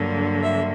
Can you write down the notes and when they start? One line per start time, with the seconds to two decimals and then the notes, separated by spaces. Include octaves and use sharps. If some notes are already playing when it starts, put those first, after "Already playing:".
Already playing: G2 D3 F#3 A#3
0.42 E5